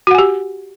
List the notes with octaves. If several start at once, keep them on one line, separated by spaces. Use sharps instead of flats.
F#4 G4 F#5 G#5